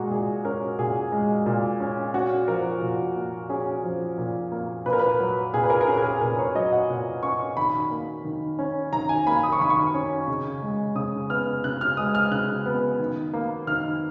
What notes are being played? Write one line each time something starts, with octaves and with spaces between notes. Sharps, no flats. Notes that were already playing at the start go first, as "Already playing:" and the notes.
Already playing: A#2 G#3 F#4 G#4 A#5
A#2 G#4
C#4 A#4
A#2 G#4
G#3
A#2
C#4
C#4 F#4
F3 A#4
A#2
A#3
C#4 G#4
F3
A#2
A#3
A#2 B4
A#4
B4
F#3
A#2 G#4
B4
A#4
A#4
C#4 G#4
A#4
G#4
A#2 A#4
C#5
F#3 D#5
F#5
A#2
C#4 C#6
D#3 B5
A#3
D#3
C#4
D#3 A#5
G#5
A#3 B5
D#6
C#6
D#3 B5
C#6
C#4
C#3
G#3
C#3 D#6
B3 F6
C#3 F#6
F6
G#3 D#6
F6
C#3 F#6
B3
D#3
A#3
D#3 F6